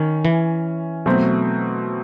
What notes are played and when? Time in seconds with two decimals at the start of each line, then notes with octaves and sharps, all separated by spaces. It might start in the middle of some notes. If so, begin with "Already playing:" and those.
Already playing: D#3 C#4
0.25 E3
1.06 B2 F#3 A3 C4